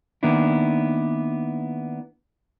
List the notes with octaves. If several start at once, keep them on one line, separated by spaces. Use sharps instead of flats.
D#3 A#3 B3 D4 E4